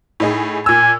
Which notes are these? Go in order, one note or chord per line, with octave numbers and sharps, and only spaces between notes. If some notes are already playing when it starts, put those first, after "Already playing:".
A2 D#4 G#4
A#2 G#5 E6